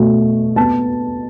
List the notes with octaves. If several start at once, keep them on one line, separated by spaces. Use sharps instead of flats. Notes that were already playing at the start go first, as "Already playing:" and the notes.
Already playing: B2 A3
B3 A5